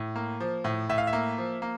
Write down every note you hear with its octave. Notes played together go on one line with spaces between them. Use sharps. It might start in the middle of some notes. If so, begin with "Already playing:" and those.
Already playing: A2
A#3
F3
A2
A2 E5
F5
E5
A#3
F3
A#3